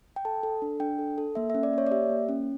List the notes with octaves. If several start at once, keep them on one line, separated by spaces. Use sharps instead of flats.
G5
A4 A5
A4
D4
D4 G5
A4
A4
A#3 E5
E5
C#4
D5
A#3 C#5
D5
G4 E5
A#3
C#4